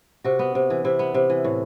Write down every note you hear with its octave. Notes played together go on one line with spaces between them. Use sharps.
C3 F#4
B3
C3
E3
C3 E4
B3
C3
E3
A2